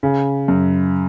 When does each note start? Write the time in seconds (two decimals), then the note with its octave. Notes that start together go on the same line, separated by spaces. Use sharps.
0.03 C#3
0.48 F#2